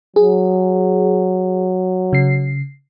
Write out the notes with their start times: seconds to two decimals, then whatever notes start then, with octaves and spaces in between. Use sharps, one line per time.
0.16 F#3 G#4
2.13 C#3 C7